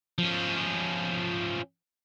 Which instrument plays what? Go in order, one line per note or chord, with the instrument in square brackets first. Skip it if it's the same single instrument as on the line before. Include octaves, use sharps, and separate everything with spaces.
[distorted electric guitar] F3 C#4